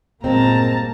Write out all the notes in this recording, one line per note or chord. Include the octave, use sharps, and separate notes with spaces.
G1 A#2 G#3 A#3 C4 A5 A#5